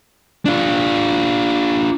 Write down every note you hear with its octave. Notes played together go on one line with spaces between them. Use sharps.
D4 F4